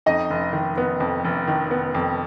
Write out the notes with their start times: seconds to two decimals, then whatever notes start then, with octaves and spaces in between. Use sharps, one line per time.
0.06 F2 D#4 D#5
0.30 F1
0.53 D#3
0.78 B3
1.00 F2
1.25 F1
1.48 D#3
1.71 B3
1.95 F2